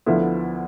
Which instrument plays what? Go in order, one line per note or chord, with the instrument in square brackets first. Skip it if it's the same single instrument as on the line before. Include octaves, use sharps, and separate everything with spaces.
[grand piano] D2 D3 F3 B3 E4